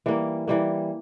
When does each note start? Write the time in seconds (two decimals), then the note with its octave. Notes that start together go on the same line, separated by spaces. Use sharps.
0.06 E3 G3 A#3
0.48 E3 G3 A#3